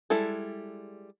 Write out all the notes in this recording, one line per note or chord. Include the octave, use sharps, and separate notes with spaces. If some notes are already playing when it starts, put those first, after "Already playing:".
G3 G#3 E4 A4